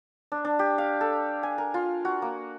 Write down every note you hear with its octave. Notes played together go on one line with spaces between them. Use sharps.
D4
D4
G4
F5
A4
G#5
A#4
F4
F#4
A#3